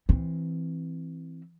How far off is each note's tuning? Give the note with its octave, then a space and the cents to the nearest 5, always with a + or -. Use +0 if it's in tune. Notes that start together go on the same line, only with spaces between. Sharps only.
E3 +0 C4 +0